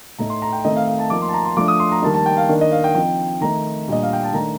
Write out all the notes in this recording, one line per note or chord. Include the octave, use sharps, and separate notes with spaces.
A2 A3 D#4 A#5
C6
A#5
G5
D#3 A3 C4 D#4 D#5
F5
F5
A5
F3 A#3 D#4 D6
C6
A5
A#5
C6
F3 A3 D4 D6
D#6
C6
A#5
D#3 G3 A#3 D#4 A5
A5
G5
F5
D#3 A#3 D4
D#5
F5
G5
F3 C4 D#4 G5
D#3 A3 D#4 A#5
A#2 G3 D4 D#5
F5
G5
A5
D#3 A3 D4 A#5